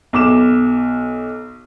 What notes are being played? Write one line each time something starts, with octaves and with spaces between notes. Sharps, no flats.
B1 D6 E7